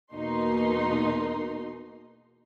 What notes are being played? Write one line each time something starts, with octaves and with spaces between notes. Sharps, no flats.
E2 B2 A#3 D#4 C6